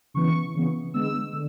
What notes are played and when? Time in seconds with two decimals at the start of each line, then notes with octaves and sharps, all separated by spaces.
0.14 C#3 E3 B3 C#6
0.54 C#3 E3 B3
0.94 D3 G#3 B3 E6
1.33 D3